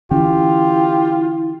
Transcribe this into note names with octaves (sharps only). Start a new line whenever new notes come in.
D3 E3 C#4 E4 F4 G4